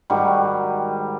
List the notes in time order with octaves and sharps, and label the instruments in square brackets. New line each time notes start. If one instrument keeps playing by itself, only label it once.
[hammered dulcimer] G#2 D#3 G3 F#4